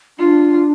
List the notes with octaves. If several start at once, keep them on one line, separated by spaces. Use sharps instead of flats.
D4 F4